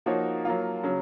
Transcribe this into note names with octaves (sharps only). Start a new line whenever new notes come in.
F3 A#3 D#4 F#4 C#5
F#3 A#3 F4
C#3 F#3